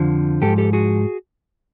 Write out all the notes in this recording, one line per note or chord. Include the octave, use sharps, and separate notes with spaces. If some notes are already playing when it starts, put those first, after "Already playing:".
Already playing: F2 D3 F3
G#2 F3 G4 A4
G4 A4
F#4 G#4